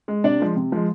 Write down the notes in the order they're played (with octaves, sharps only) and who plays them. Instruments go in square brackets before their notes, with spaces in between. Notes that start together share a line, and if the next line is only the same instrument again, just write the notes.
[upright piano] G#3
C3 D4 D5
F3 G#3
C3
F3 G#3